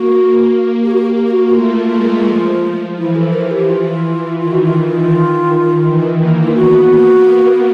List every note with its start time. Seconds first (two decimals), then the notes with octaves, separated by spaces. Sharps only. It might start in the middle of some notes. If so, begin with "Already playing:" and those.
Already playing: A#3 F#4
0.83 G4
0.91 F#4
0.98 G4
1.26 G4
1.30 F#4
1.46 F#4
1.55 A3 F4
1.91 G#3
2.26 F3
2.97 E3 E4
3.16 A4
3.33 A#4
3.51 G4
3.69 F4
4.40 D#3 F4
4.51 F#4
4.63 F4
5.84 E3
6.19 A#3
6.41 E4
6.47 F4
6.54 B3 F#4
6.91 A#3
7.25 B3